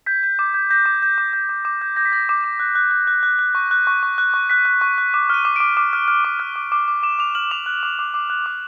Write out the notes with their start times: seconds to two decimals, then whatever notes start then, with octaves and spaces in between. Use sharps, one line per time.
0.06 G6 B6
0.23 G6
0.39 D6
0.54 G6
0.70 G6 A#6
0.86 D6
1.02 G6
1.18 D6
1.33 G6
1.49 D6
1.65 D6
1.82 G6
1.96 G6 A#6
2.05 B6
2.12 G6 A#6
2.29 D6
2.44 D6
2.60 F#6
2.75 F#6
2.91 F#6
3.07 F#6
3.23 F#6
3.39 F#6
3.55 C#6
3.71 F#6
3.87 C#6
4.03 C#6
4.18 F#6
4.34 C#6
4.50 F#6 B6
4.65 F#6
4.81 C#6
4.98 F#6
5.14 D6
5.30 F6 D#7
5.45 D6
5.56 D6 D7
5.77 D6
5.93 F6
6.08 F6
6.25 D6
6.39 F6
6.56 D6
6.72 D6
6.88 D6
7.03 D6 E7
7.19 D6 F7
7.35 F6 F#7
7.51 D6 F7
7.66 F#6
7.83 D6
7.99 D6
8.14 D6
8.30 F#6
8.46 D6